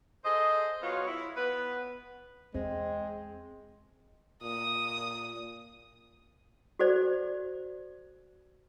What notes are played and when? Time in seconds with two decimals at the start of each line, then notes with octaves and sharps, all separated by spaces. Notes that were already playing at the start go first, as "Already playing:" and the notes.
0.25 G#4 A4 C5 D#5
0.82 F#3 B3 F4 F#4 C#5 F5
1.07 E4
1.37 B3 B4
2.54 E2 G#3 C4
4.42 A#2 D#6
6.79 F#4 A4 C5 D5